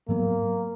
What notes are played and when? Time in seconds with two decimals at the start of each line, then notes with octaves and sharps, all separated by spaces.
0.08 G#2 F#3 A#3 B3